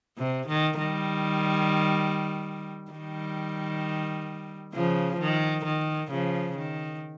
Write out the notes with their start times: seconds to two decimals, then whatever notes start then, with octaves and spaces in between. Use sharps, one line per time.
0.18 C3
0.48 D#3
0.78 D#3 G3
2.91 D#3 G3
4.73 C#3 F3
5.20 D#3
5.65 D#3
6.11 C#3 F3
6.56 D#3